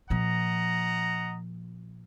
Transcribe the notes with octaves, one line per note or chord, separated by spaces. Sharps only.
A#2 F3 D#5 F#5 A#5